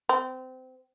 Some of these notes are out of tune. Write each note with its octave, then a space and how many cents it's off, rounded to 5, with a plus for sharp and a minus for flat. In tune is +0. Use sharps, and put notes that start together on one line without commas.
C4 -25